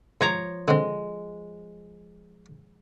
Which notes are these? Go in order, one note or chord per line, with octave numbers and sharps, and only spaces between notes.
G#2 F3 C#5 A#5
D3 G#3 C4